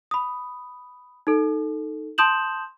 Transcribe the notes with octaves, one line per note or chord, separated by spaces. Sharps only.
B5 D#6
D#4 A4
A5 C6 D#6 G6 E7 F#7